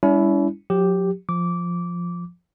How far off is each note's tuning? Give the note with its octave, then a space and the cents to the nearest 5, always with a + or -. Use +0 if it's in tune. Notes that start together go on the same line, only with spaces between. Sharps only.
G3 +30 C#4 +45 E4 +0
F#3 -40 G4 +0
F3 +0 D6 -15